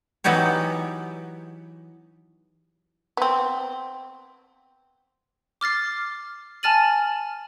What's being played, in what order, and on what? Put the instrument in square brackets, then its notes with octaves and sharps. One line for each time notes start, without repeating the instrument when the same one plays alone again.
[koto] E3 F#3 B3 D#4 G4 C#5
[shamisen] B3 C4
[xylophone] D6 F6 A6 C7
G#5 A5 F6 A6 D#7 F#7